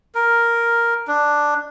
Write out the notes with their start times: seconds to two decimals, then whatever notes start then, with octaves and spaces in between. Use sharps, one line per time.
0.15 A#4
1.08 D4